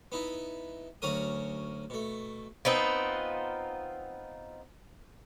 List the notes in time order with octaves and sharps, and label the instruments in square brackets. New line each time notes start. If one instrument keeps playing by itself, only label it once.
[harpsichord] B3 D#4 E4
D2 F#3 C#4 A#4 D#6
B2 A3
[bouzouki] B3 C4 D#4 F4